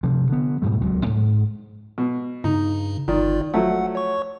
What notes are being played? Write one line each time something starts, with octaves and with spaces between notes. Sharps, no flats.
G2 C3 F3
D3 B3
G#2 B2 G3 A3
D#1 C#2 A#2 F#3
G#2
B2
G2 C#3 D#4
G1 D#3 F4 D5
F3 F#3 A3 F#5
C#5 C#6